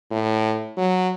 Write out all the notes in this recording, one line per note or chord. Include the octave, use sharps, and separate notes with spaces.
A2
F#3